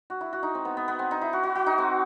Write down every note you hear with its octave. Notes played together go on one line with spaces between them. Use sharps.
F#4
E4
F#4
D#4
C4
B3
B3
B3
C4
D#4
E4
F#4
F#4
F#4
D#4
C4